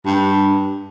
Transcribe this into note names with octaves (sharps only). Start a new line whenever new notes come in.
G2